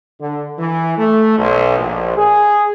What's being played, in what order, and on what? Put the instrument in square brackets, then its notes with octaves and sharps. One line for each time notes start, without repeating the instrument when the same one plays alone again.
[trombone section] D3
E3
A3
B1
A#1
G#4